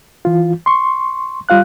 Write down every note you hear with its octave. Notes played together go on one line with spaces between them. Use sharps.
E3 F4
C6 C#6
G3 F4 F5 F#6